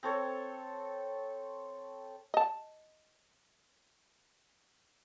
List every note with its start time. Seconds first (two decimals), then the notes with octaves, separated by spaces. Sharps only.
0.03 C4 A4 C#5
2.34 D#5 A5